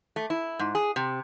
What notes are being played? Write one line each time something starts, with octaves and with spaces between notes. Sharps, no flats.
A3
E4
G#2
G#4
C3